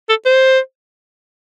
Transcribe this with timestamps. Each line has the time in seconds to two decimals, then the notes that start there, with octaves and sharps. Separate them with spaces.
0.09 A4
0.26 C5